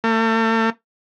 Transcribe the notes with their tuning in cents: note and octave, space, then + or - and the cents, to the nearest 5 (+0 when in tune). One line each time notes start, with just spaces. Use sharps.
A3 +40